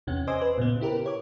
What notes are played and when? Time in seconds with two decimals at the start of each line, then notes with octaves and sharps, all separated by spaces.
0.07 E2 C3 C#4 F#5
0.27 C5 D#5 G#5 C6 D6 E6
0.41 B4
0.58 A#2 C#3 B3
0.81 E4 G4 A#4 B4
1.06 C#5 D6